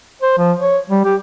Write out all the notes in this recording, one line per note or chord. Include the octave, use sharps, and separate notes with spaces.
C5
F3
C#5
G3
G4